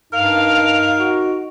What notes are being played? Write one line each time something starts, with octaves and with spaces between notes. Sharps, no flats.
G2 D#4 A#4 F5
F#4